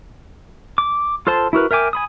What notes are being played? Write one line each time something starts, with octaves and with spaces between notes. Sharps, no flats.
D6
F4 A4 C5 A5 C6
E4 F#4 A#4 B4
A#4 E5 G5 G#5 D6
G#5 B5 D#6